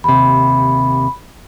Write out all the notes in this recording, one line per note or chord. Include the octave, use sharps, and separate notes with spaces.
D#2 C3 B5